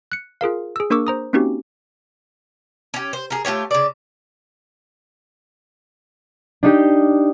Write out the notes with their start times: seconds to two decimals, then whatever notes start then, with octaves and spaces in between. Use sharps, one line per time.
0.12 F#6 C#7
0.41 F4 G#4 A#4 F5
0.76 G#4 E6
0.90 A#3 D4 A#4 C#6 D6 E6
1.07 C5 A#5 D#6
1.33 A#3 C4 C#4 D#4 F#4 G4
2.94 C#4 G4
3.13 C5
3.30 G#4 A#4
3.45 A3 F4 G4 C#5
3.71 C#3 D5
6.63 D4 D#4 G4